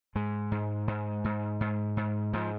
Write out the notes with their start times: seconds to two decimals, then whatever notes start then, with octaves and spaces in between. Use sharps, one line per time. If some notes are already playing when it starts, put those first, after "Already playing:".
0.15 G#2 G#3
0.52 G#2
0.88 G#2
1.24 G#2
1.61 G#2
1.97 G#2
2.33 G#2 F3